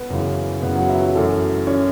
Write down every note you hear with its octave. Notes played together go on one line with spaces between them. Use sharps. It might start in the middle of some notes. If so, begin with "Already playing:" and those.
Already playing: B3 B4
F#2 C#3 E3
F#2 C#3 E3 B3 B4
F#3 F#4
E3 E4
F#3 F#4
F#2 E3 A3 A4
E3 C#4 C#5